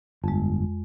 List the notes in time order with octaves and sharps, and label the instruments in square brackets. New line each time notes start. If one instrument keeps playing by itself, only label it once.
[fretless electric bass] G1 [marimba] F2 G#3